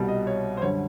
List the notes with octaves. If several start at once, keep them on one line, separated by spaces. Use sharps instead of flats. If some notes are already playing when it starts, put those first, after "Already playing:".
Already playing: C2 B2 G3
D#5
C#5
C5
F#2 D3 G3 C#5